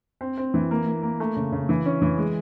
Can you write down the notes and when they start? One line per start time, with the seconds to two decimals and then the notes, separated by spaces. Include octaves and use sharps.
0.21 C4
0.37 C4
0.54 E3
0.71 A#3
0.86 A#3
1.03 A#3
1.20 A3
1.37 C#3
1.52 C#3
1.69 E3
1.86 C#4
2.02 E3
2.18 G#3